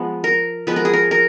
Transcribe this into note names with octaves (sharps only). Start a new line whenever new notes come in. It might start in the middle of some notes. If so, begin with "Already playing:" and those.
Already playing: F3 G#3 B3
A#4
F3 G#3 B3 B4
A#4
G#4
A#4
A#4